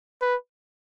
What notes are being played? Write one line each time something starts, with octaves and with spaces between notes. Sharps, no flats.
B4